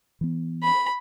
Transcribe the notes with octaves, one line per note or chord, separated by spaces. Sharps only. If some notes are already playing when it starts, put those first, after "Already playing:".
E3 B3
B5